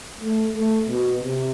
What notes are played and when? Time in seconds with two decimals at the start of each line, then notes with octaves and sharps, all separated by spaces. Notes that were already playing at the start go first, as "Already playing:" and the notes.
0.21 A3
0.54 A3
0.88 B2
1.21 C3